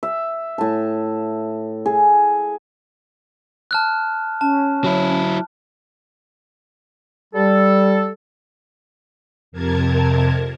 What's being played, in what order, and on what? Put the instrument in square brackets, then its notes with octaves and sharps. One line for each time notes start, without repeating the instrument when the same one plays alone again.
[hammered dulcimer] E5
A2 A5
G#4
[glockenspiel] A5 F6 F#6
[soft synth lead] C#4 [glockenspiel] A5
[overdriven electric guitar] F#3 E4
[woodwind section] G3 A4
[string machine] F2 C3 A#4 A5 G#6